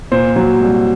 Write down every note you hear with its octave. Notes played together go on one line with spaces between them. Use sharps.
A#2 C5
F#3
C2